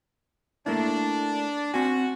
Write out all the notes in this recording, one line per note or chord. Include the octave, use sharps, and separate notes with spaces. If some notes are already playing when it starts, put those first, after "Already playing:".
A3 A#3 D4 E4
C4 F#4 G#5